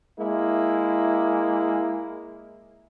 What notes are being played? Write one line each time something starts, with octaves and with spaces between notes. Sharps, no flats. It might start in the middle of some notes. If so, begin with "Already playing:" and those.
G#3 A#3 E4